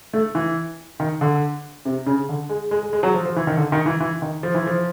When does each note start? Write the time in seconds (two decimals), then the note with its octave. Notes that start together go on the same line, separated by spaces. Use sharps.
0.13 A3
0.35 E3
1.00 D#3
1.21 D3
1.85 C3
2.06 C#3
2.29 D3
2.49 G#3
2.71 G#3
2.83 G#3
2.93 G#3
3.03 F#3
3.14 F3
3.26 F3
3.36 E3
3.47 D#3
3.57 D3
3.72 D#3
3.86 E3
4.00 E3
4.22 D#3
4.43 F3
4.54 E3
4.67 F3